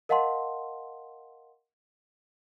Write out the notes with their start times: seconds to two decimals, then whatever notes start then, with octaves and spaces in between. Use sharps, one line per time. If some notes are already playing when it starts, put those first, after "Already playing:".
0.09 A#4 D#5 F5 F#5 A5 C6